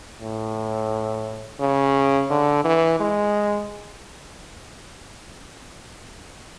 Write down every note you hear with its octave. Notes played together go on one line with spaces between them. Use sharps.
A2
C#3
D3
E3
G#3